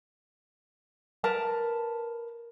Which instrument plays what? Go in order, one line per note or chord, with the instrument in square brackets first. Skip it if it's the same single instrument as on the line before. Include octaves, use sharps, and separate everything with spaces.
[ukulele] A#4 B4 A5